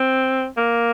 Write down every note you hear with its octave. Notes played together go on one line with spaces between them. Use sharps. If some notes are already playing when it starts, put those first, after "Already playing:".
Already playing: C4
A#3